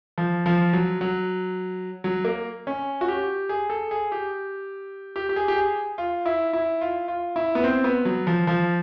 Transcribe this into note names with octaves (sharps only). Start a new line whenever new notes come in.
F3
F3
F#3
F#3
F#3
A#3
C#4
F#4
G4
G#4
A4
G#4
G4
G4
G4
G#4
G4
G#4
F4
E4
E4
F4
F4
E4
B3
C4
B3
F#3
F3
F3